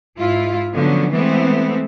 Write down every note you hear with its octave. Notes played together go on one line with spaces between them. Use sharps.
G#2 E4 F4
D3 F3 F#3 B3 C#4
E3 G#3 A3 B3 C4